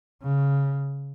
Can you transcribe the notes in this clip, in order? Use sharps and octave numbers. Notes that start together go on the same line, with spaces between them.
C#3